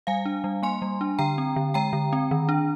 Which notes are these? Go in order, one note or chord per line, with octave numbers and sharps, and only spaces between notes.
G3 F5 G#5
D4
G3
A#3 G#5 C6
G3
D4
D3 G5 A#5
C4
D3
G#3 G5 A#5
D3
C4
D#3
D4